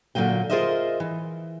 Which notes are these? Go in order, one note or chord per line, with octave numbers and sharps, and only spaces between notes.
A#2 D3 D#3 F#3 A#3 G5
F4 G#4 A#4 C5 D#5 E5
E3